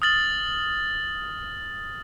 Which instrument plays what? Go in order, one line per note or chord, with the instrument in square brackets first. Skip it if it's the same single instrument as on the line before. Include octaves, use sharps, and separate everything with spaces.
[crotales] D#6 F6 A6 F#7